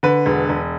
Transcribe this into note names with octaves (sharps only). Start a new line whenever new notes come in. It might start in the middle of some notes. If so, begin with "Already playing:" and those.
D3 B4
E1
E1